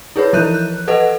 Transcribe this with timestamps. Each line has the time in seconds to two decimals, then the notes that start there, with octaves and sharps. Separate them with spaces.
0.16 E4 G#4 B4 C#5
0.33 E3 F3 E4 F#6 G6 D#7
0.54 F#6
0.88 A4 B4 D#5 F#5